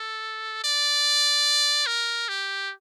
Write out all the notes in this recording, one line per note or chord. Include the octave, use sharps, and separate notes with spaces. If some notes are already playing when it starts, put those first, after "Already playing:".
Already playing: A4
D5
A#4
G4